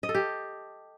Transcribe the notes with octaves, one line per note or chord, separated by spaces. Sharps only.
D#5
A4
G4